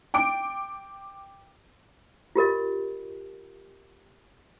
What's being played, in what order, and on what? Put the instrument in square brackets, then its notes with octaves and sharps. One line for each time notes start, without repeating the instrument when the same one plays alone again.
[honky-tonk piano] G5 D6 D7
[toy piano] F4 G4 A#4 D#5